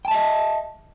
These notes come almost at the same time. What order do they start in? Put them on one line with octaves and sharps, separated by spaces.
G5 A5 E5 D#5